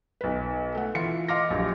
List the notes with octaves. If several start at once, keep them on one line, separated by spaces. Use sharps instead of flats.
B1 B4
A3 F#5
E3 F4 C#7
D#5 F5 C6 D6 F6 A#6
A#1 F#3 G4